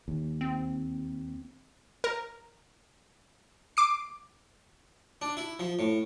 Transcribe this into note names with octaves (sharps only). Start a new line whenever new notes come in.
D#2
C4
A#4
D6 C7
D4
E4
F3
A2